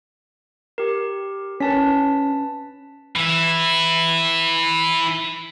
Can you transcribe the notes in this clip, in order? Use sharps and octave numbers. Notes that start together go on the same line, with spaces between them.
G4 A#4
C#4 B4 A5 B6
E3 E4